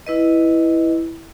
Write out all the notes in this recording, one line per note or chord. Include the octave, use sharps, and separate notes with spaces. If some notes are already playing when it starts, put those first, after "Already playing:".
E4 B4 D#5